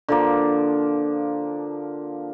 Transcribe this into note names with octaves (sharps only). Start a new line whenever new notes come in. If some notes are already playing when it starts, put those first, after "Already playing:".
D3 F3 A#3